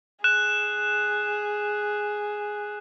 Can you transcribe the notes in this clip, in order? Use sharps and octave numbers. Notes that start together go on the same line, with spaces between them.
G#4 F#6 E7